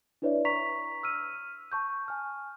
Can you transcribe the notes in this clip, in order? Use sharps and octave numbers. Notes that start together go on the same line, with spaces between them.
D4 E4 B4 C#5 D5 E5
A#5 C#6 B6 F7
E6 F6 D#7
A5 C#6 G6
G#5 F6